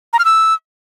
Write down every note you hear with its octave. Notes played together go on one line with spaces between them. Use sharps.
A#5
F6
E6